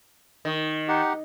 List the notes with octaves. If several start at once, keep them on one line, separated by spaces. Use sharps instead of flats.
D#3
D#4 G4 F#5